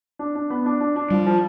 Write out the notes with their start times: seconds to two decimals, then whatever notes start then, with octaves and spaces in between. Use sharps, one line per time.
0.19 D4
0.35 D4
0.50 B3
0.66 D4
0.80 D4
0.96 D4
1.11 F3 G3
1.27 F3